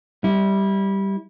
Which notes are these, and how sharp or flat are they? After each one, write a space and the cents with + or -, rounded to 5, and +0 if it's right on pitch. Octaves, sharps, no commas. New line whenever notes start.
G3 +0 E4 -20